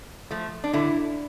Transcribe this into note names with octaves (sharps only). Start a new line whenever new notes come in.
F3 A3
D4
D3 E4